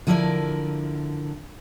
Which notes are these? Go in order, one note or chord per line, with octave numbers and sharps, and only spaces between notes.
D3 F3 E4 A4 A#4 D5